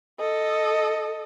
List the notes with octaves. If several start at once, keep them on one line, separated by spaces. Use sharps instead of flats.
A4 D#5